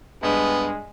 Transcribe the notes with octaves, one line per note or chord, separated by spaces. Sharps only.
G2 G#3 B3